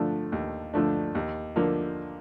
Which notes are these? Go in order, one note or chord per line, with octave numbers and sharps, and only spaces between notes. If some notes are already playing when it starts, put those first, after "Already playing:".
Already playing: D3 F3 A3 D4
D#2
D3 F3 A3 D4
D#2
D3 F3 A#3